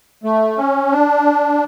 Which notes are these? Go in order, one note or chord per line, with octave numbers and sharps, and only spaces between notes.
A3
C#4
D4